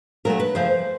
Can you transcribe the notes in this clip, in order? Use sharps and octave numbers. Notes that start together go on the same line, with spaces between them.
A#2 F#3 A3 A#4
B4
F2 C#3 F3 A3 C5